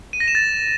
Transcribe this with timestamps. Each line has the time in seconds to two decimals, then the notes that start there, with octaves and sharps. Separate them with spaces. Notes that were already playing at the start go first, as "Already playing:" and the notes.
0.13 D#7
0.20 A#6
0.28 E7
0.35 A6